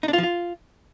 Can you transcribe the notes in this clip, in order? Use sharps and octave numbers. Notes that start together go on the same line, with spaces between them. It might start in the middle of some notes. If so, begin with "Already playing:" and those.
D#4
D4
F4
F3
F4